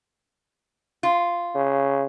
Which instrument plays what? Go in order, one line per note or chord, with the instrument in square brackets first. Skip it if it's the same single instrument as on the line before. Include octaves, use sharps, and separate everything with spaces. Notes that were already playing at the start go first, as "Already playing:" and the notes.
[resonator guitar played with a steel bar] F4
[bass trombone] C#3